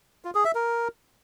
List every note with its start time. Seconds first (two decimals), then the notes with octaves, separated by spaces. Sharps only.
0.25 F4
0.35 G#4
0.45 E5
0.55 A#4